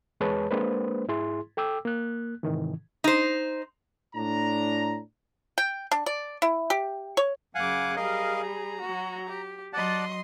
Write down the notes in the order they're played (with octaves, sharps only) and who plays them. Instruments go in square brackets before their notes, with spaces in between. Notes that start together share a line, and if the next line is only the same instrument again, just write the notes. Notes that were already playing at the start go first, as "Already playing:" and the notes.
[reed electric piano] E2 G#3 G#4 B4 C#5 A5
G#3 A#3 D4 B4 C5
G#2 E4 G#4 C6
A4 G5 D6 E6
A#3 F#6
G#2 C3 D#3 E3
[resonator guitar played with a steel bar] D#4 C5
[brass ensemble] A2 D4 A#5
[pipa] G5
D4
D5
E4
G4
C#5
[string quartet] F#2 C#3 D6 [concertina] F5 F#5 G#5
[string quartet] G3 G#4 [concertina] A#4 D#5 F5
[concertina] A#5
[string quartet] F#3 F#4
G4
[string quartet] F#3 D#5 C6 [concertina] D5 F#5 A5